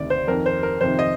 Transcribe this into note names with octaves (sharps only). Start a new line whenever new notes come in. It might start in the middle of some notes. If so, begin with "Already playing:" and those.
Already playing: D2 C3 D#3 D5
C5
F2 D#3 A#4
C5
A#4
F2 C3 D#3 C5
D#5